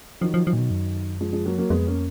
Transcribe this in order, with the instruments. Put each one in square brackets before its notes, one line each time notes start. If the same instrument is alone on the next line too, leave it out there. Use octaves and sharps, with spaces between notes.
[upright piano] D#3 F#3 [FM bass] F3
[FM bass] F3
F3
A#2
B2
F#2
[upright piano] F3 G#3
F3 G#3
F#3 A#3
F#3 A#3
[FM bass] F2 [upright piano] G#3 B3
[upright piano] A#3 C#4